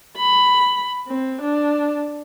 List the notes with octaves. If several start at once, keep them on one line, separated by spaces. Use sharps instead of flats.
B5
C4
D4